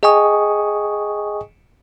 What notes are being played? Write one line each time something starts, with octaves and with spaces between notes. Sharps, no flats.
G#4 D#5 G5 G#5 C#6 D#6